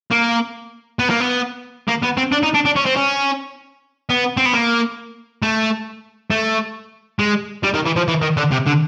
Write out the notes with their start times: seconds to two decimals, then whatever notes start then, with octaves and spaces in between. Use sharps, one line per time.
0.11 A#3
0.99 B3
1.10 A#3
1.20 B3
1.88 A#3
2.03 B3
2.18 C4
2.32 D4
2.43 D#4
2.55 D4
2.66 D4
2.76 C#4
2.86 C4
2.96 C#4
4.10 B3
4.37 C4
4.46 B3
4.54 A#3
5.42 A3
6.31 A3
7.19 G#3
7.63 G3
7.74 D#3
7.86 E3
7.96 F3
8.08 E3
8.22 D#3
8.37 D3
8.52 C3
8.67 D3